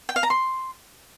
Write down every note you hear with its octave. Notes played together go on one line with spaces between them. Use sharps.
G5
F5
A#5
C6